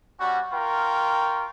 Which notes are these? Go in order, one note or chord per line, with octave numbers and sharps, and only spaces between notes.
G3 C#4 F#4
F4 A#4 G5 C#6